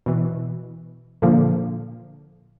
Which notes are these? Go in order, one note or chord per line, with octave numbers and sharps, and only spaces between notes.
B2 E3
A#2 D3 F3 A#3